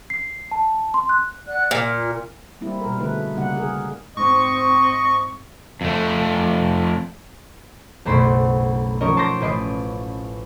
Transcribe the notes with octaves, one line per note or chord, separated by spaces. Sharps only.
C7
A5
C6
F#6
D5 F#5 F#6
A#2 F6
G3 A#3 C4 E4
B2 G3 A#4
D3 G#3 A3 D#4 B4
C#3 G3 A#3 D#4 F#5
G#4 A#4
G#2 C4 D#5 C#6
F2 A3
F#1 B1 A3 C5 B5 C6
F3 C#4 D#4 A#4 C#5 D#5
A5 C6 D6 G6 A#6
A1 B4 D#5 C7 D7